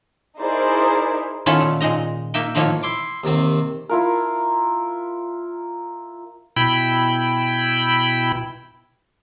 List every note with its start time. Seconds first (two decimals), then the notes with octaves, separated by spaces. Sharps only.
0.40 D#4 E4 G#4 A#4 C5 D5
1.46 D#3 B3 C#4 E4 F4 A4
1.61 A#2
1.81 A#2 G#3 D#4 D#5 A#5
2.34 A#3 D#4 E5 G5
2.55 A2 D#3 F3 A#3 F4 C#5
2.83 E4 C6 D6
3.24 D#2 C3 D#3 C4
3.89 E4 F4 A#4
6.56 B2 E4 G5 B5